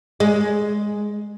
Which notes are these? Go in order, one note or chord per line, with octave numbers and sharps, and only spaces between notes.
G#3